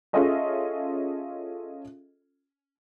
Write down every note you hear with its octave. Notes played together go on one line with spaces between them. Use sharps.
C#4 F4 G#4 A4 D#5 E5